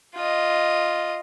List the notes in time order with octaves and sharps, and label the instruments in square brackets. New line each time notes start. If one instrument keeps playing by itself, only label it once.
[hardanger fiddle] F4 D#5